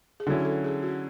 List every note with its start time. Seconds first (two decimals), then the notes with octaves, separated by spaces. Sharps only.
0.20 G#4
0.27 D3 F#3 C#4 E4 A4
0.45 A4
0.64 G#4
0.83 F#4